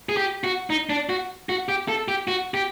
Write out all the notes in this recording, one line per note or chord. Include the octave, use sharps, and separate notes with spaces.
G#4
G4
F#4
D#4
D4
F#4
F#4
G4
A4
G4
F#4
G4